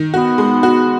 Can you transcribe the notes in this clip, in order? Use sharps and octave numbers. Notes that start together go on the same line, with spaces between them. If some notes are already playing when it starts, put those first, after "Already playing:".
Already playing: D#3
B3 F#4
G#3
F#4